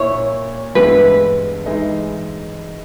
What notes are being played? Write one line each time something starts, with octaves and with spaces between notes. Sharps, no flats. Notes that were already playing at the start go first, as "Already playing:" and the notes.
Already playing: A#2 A#3 E4 C#5
G2 E3 G#3 B3 E4 B4
E3 G#3 D#4